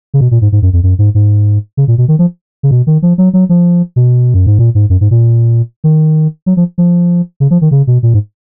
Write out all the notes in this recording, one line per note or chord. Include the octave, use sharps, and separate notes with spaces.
C#3
B2
A#2
G#2
G#2
F#2
F2
F#2
G#2
G#2
C#3
A#2
B2
D#3
F3
C#3
B2
D#3
F3
F#3
F#3
F3
B2
F#2
G#2
A#2
G#2
F#2
G#2
A#2
D#3
F#3
F3
F3
C#3
F3
D#3
C#3
B2
A#2
G#2